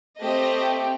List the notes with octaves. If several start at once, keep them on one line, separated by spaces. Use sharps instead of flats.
A3 C4 G4 D#5